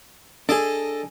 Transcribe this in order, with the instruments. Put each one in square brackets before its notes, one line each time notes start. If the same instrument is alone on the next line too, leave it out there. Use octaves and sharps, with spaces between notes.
[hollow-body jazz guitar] D4 G#4 [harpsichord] A4 D#5